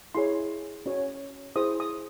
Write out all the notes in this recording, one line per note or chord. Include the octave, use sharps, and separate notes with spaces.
E4 G#4 C#5 C6
C#4 F#4 C#5
E4 G#4 C5 D#6
D#6